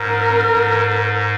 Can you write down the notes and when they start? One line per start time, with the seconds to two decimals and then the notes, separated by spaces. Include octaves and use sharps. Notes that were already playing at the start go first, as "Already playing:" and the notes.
Already playing: G#2 A#4
0.47 G#2